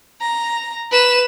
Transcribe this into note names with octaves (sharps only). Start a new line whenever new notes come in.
A#5
B4 E7